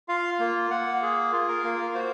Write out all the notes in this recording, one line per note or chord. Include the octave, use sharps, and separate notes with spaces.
F4 F5
A#3
A#3 F#5
G#4
F4
A#4
A#3
F#4 C5